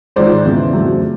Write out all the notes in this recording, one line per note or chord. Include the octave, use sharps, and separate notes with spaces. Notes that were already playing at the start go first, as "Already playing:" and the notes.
G#2 D#3 G#3 C5 D5
E2 C#3 E3
F2 C#3 F#3 A3